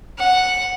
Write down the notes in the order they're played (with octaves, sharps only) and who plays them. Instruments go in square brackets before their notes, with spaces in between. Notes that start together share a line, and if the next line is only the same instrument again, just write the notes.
[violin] F#5